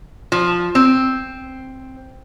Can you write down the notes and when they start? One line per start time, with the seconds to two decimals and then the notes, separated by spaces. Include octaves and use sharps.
0.32 F3
0.75 C4